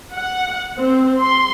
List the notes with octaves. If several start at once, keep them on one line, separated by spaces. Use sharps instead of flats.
F#5
C4
C6